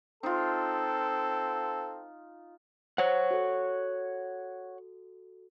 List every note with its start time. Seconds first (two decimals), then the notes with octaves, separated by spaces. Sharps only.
0.23 C4 D#4 F4 A4
2.98 C5 C#5 F#5
3.31 F#4 A4